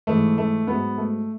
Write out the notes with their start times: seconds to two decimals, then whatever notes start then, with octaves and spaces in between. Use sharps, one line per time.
0.07 G#2 E3 A3
0.38 A3
0.67 G#2 F#3 B3
0.98 A3